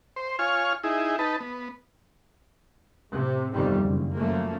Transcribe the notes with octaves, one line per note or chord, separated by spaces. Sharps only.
C5
F4 C#5 G#5 F6
D#4 E4 G#4
D#4 B4 A5
B3
A2 C3
G1 F2 C3 D#3 G3
F#1
F#2 F3 A3 A#3